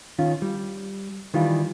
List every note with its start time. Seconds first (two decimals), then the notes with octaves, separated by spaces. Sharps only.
0.18 D#3 C#4 F4
0.42 G3
1.34 D#3 E3 G3 F4